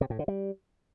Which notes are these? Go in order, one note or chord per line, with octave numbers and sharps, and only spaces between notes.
C3
A2
D3
G3